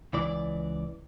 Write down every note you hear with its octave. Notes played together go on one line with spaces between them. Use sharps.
C#2 E3 D5